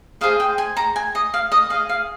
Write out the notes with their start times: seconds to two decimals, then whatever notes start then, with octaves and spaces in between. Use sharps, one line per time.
0.21 G#4 C5 D#5 F5
0.40 G5
0.58 G#5
0.77 A#5
0.96 G#5
1.15 D#5
1.34 F5
1.52 D#5
1.70 G#4 F5
1.74 D#5
1.89 F5